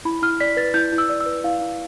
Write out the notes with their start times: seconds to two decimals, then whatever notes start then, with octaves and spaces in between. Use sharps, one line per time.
0.05 E4 B5
0.22 E4 F6
0.40 D5 B6
0.57 B4 A6
0.74 E4 G6
0.92 E4
0.98 E6
1.09 D5
1.20 E6
1.26 B4
1.44 E4 F5
1.61 E4